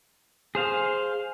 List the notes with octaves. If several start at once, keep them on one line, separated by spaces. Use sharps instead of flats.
G#4 C5 F5